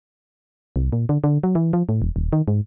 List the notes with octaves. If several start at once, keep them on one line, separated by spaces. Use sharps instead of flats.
C2
A#2
D3
D3
F#3
E3
F3
A2
E1
D#1
D#3
G#2